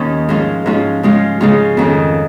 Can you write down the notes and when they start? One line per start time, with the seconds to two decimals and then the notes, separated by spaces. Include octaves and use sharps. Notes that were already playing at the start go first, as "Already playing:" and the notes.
Already playing: D#2 D#3 C#4
0.29 G#2 F3 C#4 F4
0.66 G#2 F3 C#4 F4
1.03 C#3 G#3 C#4 F4
1.41 C#3 G#3 C#4 F4
1.77 F2 D#3 C#4